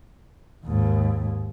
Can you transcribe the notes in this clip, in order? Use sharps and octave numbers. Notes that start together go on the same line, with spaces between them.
D#2 G#2